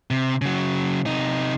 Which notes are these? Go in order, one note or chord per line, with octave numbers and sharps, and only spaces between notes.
C3
C#3 F#3
C3 D#4